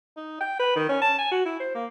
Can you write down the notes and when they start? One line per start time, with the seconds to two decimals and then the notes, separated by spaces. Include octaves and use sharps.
0.17 D#4
0.40 G5
0.59 B4
0.76 D#3
0.89 C#4
1.02 A5
1.18 G#5
1.31 F#4
1.45 E4
1.60 C5
1.74 A#3